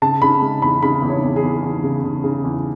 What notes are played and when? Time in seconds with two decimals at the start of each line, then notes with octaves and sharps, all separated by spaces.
0.02 C#3 A5
0.22 C#3 B5
0.42 G#3
0.62 E2 B5
0.82 C#3 B5
1.02 E2
1.10 C#5
1.23 E2
1.36 G#4
1.43 E2
1.63 E2
1.83 C#3
2.04 C#3
2.24 C#3
2.44 E2